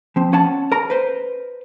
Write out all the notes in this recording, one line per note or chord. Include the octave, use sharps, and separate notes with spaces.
F3 C4
C#4 F#5 A5
A#4 A#5
B4 C5